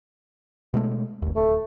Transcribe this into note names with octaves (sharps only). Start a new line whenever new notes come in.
B2 G#3 A3
G1 D#2
D1 A3